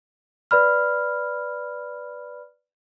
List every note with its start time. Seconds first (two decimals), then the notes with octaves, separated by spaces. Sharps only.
0.51 B4 D5 B5 F6